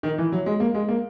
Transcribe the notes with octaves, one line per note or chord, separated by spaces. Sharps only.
D#3
E3
F#3
G#3
A#3
G#3
A#3